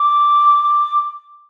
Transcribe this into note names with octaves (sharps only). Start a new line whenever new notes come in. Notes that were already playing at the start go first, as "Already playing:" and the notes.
Already playing: D6